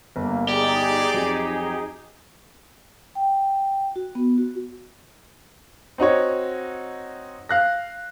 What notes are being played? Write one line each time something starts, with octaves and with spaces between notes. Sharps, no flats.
G1 A#3
D#4 G4 G#4 D5
F2 F#3
G5
F#4
B3
F#4
C4 D#4 F#4 C#5
F5 F#6 A#6